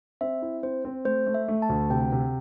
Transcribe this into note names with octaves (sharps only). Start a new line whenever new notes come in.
C4 E5
E4
C4 C5
C4
A3 C5
A3
E5
A3
A5
D2
C3 G5
C3